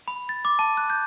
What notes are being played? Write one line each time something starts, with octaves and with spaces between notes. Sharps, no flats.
B5
A6
D6
A5
F#6
G6